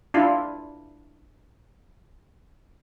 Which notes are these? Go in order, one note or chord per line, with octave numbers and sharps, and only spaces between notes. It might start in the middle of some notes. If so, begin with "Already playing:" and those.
D4 E4 F4